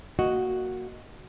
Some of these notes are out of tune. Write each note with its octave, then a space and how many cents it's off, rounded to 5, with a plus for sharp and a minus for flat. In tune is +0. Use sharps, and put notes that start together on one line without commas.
A#3 +0 F#4 +0 D#5 +0